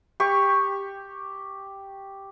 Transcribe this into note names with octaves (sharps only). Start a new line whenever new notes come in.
G4 C#6